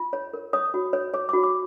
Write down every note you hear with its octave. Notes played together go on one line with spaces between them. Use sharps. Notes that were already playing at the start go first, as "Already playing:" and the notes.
Already playing: F4
C#5
A#4
C#5 D#6
F#4
C#5
C#5 D6
F#4 D6
D6